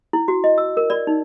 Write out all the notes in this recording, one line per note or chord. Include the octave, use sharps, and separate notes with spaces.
E4
F#4
D#5
E6
A#4
D5
D#4